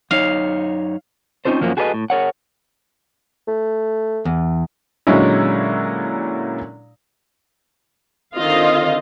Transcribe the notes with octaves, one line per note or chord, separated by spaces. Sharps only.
F#2 D#4 C#5 F5
C4 C#4 D#4 F4 A4 C5
F#2 F3 F#3 A#3 C#4
F#4 G#4 A4 B4 C#5 D#5
A2
G#4 A#4 C#5 F#5
A3
E2
A#2 D3 F#3 G#3 C#4 E4
D3 D#3 C4 F4 D#5 F5